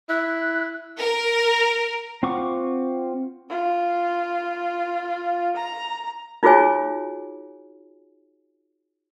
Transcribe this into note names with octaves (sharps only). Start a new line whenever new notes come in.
E4 F#6
A#4
C4 F4 F#5 C#6 D6
F4
A#5
D#4 F4 F#4 G#4 C#5 G#5